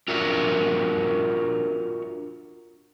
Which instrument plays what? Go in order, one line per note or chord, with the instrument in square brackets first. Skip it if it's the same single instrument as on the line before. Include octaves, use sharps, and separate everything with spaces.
[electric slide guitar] D4 F4 F#4 A#4 C#5 E5